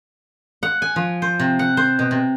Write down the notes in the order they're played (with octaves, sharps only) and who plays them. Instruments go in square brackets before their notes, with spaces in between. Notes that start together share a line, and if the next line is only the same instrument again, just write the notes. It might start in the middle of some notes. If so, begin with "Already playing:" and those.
[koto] F#5
G#5
F3
C5
C3
F#5
C5
B2
C3